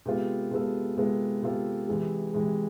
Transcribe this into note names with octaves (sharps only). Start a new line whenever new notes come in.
C3 G#3 B3 F4 A4
C3 G#3 B3 F4 A4
C3 G#3 B3 F4 A4
C3 G#3 B3 F4 A4
C3 E3 G#3
C3 E3 G#3